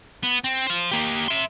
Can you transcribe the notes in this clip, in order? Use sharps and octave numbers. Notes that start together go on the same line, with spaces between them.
B3
C4
C5 F5
A#3 G4
E5 C6